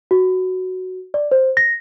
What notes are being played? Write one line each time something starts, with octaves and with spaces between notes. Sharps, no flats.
F#4
D5
C5
A#6